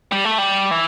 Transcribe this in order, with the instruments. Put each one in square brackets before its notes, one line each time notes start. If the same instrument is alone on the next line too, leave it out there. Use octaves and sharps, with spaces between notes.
[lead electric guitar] G3
A3
G3
E3